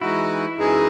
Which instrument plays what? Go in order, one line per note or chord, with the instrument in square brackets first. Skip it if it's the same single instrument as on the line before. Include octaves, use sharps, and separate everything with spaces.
[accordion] E3 G#3 D#4 F#4 [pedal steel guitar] E4
[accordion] F#2 E3 G#3 D#4 G#4